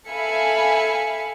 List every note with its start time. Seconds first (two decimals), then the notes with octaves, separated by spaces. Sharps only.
0.10 A4 E5 F5 G#5 B5 C#7